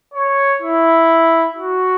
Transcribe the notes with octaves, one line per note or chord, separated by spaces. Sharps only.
C#5
E4
F#4